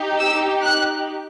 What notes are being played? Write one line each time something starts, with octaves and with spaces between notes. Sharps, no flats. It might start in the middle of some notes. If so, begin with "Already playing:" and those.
Already playing: D#4 G4
E6
F#6